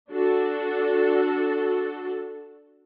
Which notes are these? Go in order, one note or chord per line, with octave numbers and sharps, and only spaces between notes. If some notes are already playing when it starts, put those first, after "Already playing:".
D4 F#4 A4